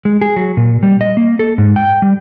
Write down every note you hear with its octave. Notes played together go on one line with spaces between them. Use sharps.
G#3
G#4
F#3
A#2
G3
D#5
A#3
A4
G#2
G5
G3